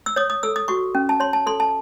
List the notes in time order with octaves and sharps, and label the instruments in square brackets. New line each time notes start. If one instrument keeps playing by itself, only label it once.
[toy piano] E6
C#5 D#6
D#6
A4 E6
D#6
F#4 C#6
C#4
A5
C#5 C6
A5
A4 C6
A5